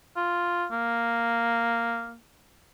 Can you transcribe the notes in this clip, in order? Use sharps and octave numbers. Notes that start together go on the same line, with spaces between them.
F4
A#3